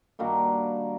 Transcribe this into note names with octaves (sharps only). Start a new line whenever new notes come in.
G2 D#3 A#3 F#4